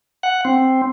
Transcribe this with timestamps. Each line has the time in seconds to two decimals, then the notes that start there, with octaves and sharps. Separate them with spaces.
0.23 F#5
0.45 C4